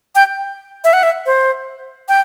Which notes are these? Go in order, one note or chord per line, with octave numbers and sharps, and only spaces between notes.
G5
E5
F#5
E5
C5
G5